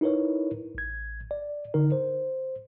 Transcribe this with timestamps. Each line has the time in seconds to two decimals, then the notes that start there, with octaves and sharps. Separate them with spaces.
0.01 D#4 E4 A#4 B4 C#5
0.75 A1 G#6
1.31 D5
1.74 D3 D#4 A#4
1.92 C5